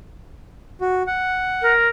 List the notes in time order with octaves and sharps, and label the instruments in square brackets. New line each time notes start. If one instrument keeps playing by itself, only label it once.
[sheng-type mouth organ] F#4
F#5
[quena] A#4